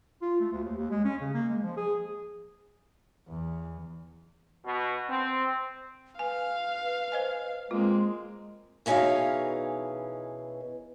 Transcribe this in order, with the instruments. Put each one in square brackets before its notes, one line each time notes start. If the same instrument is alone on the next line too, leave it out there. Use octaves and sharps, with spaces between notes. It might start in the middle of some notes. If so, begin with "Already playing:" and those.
[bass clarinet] F4
A3
D2
D#2
D#2
G#3
C#4
C#3
A#3
G#3
F3
G#4
[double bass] E2
[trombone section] B2
C4
[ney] B4 [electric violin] F5 [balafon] G#5
[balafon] C5 D#5 G#5
[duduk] G#3 [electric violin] A#3 C4 [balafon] F4
[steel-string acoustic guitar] B2 E3 C#4 D#4 G#4 F5